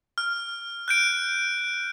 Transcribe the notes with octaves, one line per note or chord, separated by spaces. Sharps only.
F6
F#6 G6 D7